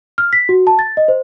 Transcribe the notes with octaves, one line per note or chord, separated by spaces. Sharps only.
F6
B6
F#4
A5
A6
D#5
C5